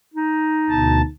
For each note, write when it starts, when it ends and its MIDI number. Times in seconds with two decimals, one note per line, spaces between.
0.14 1.08 63
0.69 1.02 38
0.69 1.02 47
0.69 1.02 81